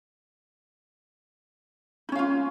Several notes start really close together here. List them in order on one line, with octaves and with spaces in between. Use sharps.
D#4 C#4 F5 F4